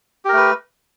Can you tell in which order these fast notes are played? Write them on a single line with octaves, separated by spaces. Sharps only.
G4 A#4 A3 B4